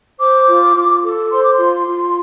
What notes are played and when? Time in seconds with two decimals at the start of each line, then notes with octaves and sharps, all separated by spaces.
0.19 C5 D6
0.47 F4
0.75 F4
1.03 A4
1.31 C5 C6
1.42 D6
1.52 C6
1.59 F4
1.87 F4